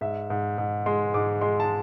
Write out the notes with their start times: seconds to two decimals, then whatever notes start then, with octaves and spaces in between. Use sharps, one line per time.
0.01 G#2 E5
0.30 G#2
0.58 G#2
0.86 G#3 C6
1.14 G#2 D6
1.41 G#3 C6
1.60 A5